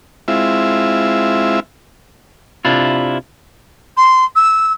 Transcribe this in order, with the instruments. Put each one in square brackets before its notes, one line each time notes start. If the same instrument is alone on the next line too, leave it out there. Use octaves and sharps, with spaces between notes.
[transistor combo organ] G#3 C4 E4 F4 E5
[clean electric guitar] C3 D4 E4 F4
[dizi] C6
E6